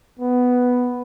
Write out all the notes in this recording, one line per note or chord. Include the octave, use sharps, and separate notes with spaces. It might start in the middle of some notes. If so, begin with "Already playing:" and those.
B3